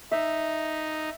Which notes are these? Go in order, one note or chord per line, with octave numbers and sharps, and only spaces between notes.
D#4 E5